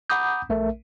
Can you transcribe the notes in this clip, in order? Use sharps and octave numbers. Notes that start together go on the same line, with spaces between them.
F#5 A#5 B5 D6 D#6 G6
A#1 A3 A#4 E5